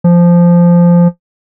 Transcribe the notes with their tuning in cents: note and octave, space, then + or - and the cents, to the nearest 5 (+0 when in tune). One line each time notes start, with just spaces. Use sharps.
F3 -10